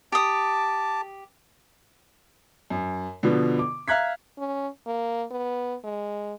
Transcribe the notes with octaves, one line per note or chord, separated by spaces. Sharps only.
G4 A5 D6 D#6
F#2
B2 D3 F3 B3
D6
E5 F5 A#5 F#6 G#6 B6
C#4
A#3
B3
G#3